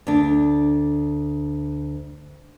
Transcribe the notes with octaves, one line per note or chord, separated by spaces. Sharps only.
D2 D4